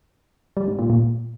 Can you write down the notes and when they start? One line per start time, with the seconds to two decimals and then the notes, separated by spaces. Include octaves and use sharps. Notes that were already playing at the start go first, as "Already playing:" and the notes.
0.57 G3
0.68 G#2
0.79 A#2
0.90 A#2